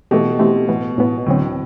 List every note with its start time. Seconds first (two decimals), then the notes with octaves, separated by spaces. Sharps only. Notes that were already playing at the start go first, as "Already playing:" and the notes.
0.11 B2 E3 A3 C4 G4
0.39 E3 A3 C4 G4
0.69 A2 E3 B3
0.98 A2 E3 B3
1.17 B2
1.26 D2 A2 D3 F#3 C4